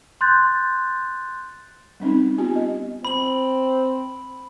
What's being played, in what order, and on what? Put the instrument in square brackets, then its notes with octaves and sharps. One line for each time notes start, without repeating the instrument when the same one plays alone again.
[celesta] C6 F#6 G6 A6
[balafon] G3 C4 C#4 D#4
B3 F4 G4 G#5
D#5
[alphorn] C4 [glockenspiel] B5 F#7